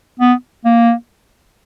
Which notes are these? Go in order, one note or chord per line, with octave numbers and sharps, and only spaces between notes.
B3
A#3